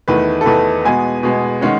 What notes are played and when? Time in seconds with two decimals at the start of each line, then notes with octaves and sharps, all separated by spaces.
0.08 E2 D#3 A3 B4
0.41 A4
0.46 E2 D#3 A3 B4
0.85 B2 G#3 B3 G#5
1.23 B2 G#3 B3
1.61 D#3 G#3 C#4 F#5